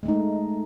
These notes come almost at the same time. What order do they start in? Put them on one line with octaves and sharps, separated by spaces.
G#3 A3 D#4